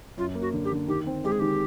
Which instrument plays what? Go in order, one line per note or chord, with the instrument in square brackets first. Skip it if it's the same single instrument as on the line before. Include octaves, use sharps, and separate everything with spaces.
[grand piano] F#2 [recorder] F4
[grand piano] A#3
[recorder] F#4
[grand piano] D3
[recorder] G4
[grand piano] D3
[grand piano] D#3 [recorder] G4
[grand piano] C4
[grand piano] G#3 [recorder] G4
[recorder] G#4
[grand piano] D#3 [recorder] G4